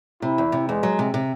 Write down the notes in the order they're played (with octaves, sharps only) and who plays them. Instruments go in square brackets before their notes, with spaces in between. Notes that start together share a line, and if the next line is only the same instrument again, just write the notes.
[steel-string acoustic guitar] C3 [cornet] E4
[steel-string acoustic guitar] E2
C3
[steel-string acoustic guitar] E2 [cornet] G#3
[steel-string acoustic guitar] F#3
C3
C3